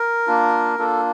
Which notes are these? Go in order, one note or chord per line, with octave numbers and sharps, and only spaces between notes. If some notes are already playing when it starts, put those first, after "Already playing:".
Already playing: A#4
A#3 D4 F4
A#3 D4 F4 A4